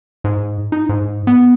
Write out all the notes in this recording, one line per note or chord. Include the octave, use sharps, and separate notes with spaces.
G#2
D#4
G#2
B3